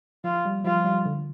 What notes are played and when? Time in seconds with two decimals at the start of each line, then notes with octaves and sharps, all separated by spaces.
0.24 F3 F4
0.45 G3
0.64 F3 F4
0.85 G3
1.06 D3